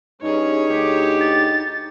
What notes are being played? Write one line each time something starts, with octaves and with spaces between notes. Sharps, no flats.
G2 C#4 D#4 G#4 C#5
D2 G4
A6